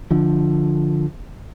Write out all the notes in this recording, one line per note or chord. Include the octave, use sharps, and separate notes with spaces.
D3 F3